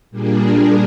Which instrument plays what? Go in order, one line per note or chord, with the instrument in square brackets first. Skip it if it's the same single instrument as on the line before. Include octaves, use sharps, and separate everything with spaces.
[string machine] A#2 G3 A#3 D4 G#4